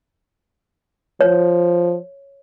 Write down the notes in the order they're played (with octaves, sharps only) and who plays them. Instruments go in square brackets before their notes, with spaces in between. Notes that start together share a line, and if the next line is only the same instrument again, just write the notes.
[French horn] F3 [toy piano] C#5